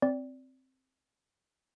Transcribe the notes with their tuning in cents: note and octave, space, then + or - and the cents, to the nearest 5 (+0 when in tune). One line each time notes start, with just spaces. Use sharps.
C4 +0 D5 -20